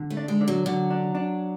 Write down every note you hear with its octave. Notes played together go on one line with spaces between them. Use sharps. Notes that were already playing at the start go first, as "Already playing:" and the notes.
Already playing: D3
A3
D4
G#3
D3
F#3
D3 F#3
D4
D4